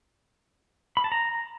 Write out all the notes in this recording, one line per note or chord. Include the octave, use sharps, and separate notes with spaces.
B5
A5
A#5